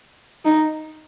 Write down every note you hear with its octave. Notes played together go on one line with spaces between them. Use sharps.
D#4